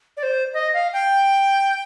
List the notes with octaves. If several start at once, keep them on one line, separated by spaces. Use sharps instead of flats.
D5
C5
D#5
F5
G5